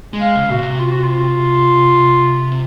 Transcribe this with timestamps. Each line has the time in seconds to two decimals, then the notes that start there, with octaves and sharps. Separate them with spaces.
0.13 G#3
0.21 F5
0.36 C#3
0.49 A#2 F#4
0.59 C3
0.80 F4
0.92 F#4
1.03 F4
2.52 C3